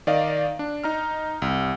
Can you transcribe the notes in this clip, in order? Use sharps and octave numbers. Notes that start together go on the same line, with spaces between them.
D#3 D5 D#5 F5
D4
D#4 A#5 F6
C2